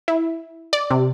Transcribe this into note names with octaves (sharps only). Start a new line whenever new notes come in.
E4
D5
C3